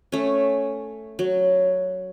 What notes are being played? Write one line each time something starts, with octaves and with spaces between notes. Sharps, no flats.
A3 C#4
F#3